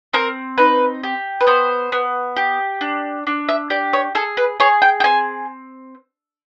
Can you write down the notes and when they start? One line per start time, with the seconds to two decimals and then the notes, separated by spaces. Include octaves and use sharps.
0.13 C4 A#4
0.58 D#4 B4
1.03 G4
1.41 B4
1.47 B3 C5
1.92 B3
2.36 G4
2.81 D4
3.27 D4
3.49 E5
3.70 G4 D5
3.93 C#5
4.15 G#4 A4
4.37 B4
4.60 G#4 C#5
4.82 G5
5.00 G5
5.04 C4 G#5